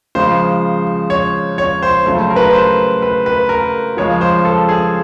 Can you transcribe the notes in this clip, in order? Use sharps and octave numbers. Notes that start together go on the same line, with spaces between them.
C#3 F3 G#3 C5
C#5
C#5
C5
C#3 F#3 A3
C5
A#4
B4
A#4
C5
B4
B4
A#4
C#3 F3 G#3 C#5
C5
A4
G#4